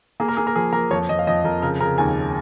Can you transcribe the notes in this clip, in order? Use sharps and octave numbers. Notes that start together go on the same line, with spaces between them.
A#3 G#4
A#4
A#3 G#4
A#4
F3 G#4
A#3 A#4
F2 C#5
F2 D#5
F5
F2 D#5
F2 A#4
C#3 A#4
C#3 A#4
D#2 G#5